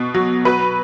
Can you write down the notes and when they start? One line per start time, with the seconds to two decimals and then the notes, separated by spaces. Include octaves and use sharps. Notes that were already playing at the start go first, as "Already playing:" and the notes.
Already playing: B2
0.14 F#3
0.45 F#3 B4